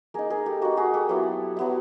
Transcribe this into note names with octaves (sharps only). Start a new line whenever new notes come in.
A#3 D#4 G#4 A#4
G#4 A#4
G4 A4
A#3 D#4 F#4
F#4 G#4
G4 A4
F#3 B3 E4
F#3 B3 E4